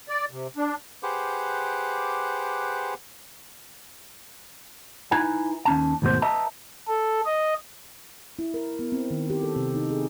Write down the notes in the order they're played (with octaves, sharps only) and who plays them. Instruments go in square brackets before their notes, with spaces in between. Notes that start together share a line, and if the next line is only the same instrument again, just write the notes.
[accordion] D5
C3
D4
[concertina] G4 G#4 B4 C5 F#5 D6
[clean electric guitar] D#4 E4 B4 G#5 A#5
D#2 C#4 A5
D#2 G#2 B2 A3 C5
B4 D#5 E5 A5 A#5
[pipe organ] A4
D#5
[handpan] E4
A#4
B3
C4
D#3
G4
A4
C3
D#4
G#4